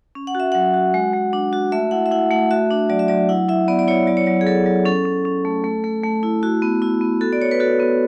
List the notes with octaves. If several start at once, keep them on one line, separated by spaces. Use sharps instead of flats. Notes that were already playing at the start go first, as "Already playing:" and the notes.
C#4
F#5
F#4 E5
F#3 F#5
F#4
G#3
G#3
D4
F#4
A3 E5
E4 F#5
E5
E4 F#5
A3 F#5
F#4 E5
D4
F#3 D5
E5
F#3 D5
E4 F#5
E4 E5
B3 D5
D5
E4 C#5
F#3 D5
C#5
F#3 D5
G#4
F#3 A4
F#3
C#4 A4
C#4
C#4
A3
A3
A3
A3
E4
E4 F#4
B3
E4
B3
F#4 A4
D5
F#4 C#5
B4
F#4 A4
B3